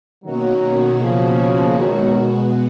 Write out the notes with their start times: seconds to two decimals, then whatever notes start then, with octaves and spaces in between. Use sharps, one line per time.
0.25 B2 D#3 F#3 A#3 C#4 F#4
1.01 C#3 F3
1.78 B2 D#3 F#3 G#3 B3 F#4